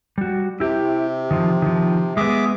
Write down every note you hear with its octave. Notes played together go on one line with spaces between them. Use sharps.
G3 F#4
C3 E4 G4
D#3 F3
D#3 F3
G#3 B3 G#4 E5 D6